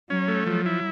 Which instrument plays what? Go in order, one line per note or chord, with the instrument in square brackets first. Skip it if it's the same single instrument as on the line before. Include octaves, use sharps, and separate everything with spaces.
[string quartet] F#3 [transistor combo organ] C#4
[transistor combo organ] A3
[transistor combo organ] F3 [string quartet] F#3
[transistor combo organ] E4